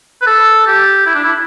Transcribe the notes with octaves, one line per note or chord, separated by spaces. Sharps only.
B4
A4
G4
E4
D4
E4